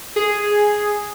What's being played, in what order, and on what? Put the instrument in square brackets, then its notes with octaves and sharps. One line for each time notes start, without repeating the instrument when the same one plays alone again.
[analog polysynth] G#4